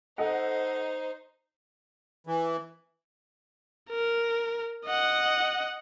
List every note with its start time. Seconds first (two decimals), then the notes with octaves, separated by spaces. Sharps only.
0.18 D#4 A4 C5 D#5 F#5
2.27 E3
3.91 A#4
4.86 D#5 F#5